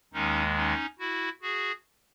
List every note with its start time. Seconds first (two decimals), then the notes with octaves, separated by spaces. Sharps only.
0.13 D#2 D#3 G#3 C#4 D#4
0.56 C#4 D#4
0.99 E4 F#4
1.41 F#4 G#4